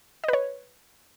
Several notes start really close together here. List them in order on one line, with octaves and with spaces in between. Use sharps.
D#5 B4 C#5